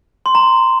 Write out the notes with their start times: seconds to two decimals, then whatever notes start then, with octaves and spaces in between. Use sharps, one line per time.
0.26 C6
0.35 A#5